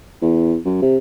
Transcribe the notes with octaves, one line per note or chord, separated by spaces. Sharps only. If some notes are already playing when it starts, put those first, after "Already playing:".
E2
F#2
C3